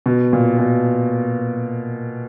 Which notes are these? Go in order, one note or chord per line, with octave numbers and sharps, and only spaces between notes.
B2
A#2
B2